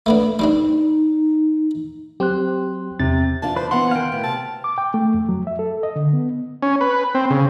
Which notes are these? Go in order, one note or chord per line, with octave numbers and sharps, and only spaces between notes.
A3 B3 D4
G3 C4 D4 D#4
F#3 C4 G4 C6 F#6
E2 C3 A6
E3 D4 F4 A5
B4 C5
E3 B3 F#5 C6
D#3 F5 G5 G#5
A2 B3
C3 A5
D6
G5
A3
F2
F#3
E5
A4
D#5
D3
B3
C#4
B4
C4
C#3